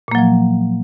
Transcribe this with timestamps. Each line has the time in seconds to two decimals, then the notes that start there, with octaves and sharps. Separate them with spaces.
0.08 A#2
0.11 A#3
0.15 F#3
0.18 F3